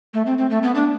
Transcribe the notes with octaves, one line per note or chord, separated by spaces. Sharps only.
A3
C4
C4
A3
B3
D4